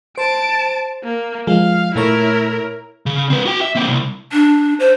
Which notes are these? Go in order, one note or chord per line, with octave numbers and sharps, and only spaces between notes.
C5 A5 D7
A#3
F3 G#3 F5
A#2 A3 E4 A#4 C#5
C#3
C4 B4
F#4 G5
E5
A#3 C4
C2
D4
C5